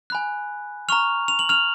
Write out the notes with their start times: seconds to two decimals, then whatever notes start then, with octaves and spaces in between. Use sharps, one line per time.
0.10 G#5 B5 F#6
0.89 A#5 C#6 F6 F7
1.28 F7
1.39 F#7
1.49 F6 F7